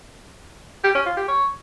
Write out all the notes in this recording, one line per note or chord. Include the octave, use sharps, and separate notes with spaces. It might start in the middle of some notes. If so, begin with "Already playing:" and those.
G4
C#4
F4
G4
C#5